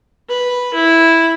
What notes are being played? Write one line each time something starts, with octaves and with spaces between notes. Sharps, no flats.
B4
E4